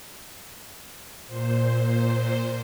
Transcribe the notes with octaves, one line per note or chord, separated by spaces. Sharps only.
A#2 C5